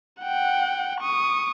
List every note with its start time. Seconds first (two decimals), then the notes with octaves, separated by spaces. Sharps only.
0.21 F#5 G5
1.01 C#6 D#6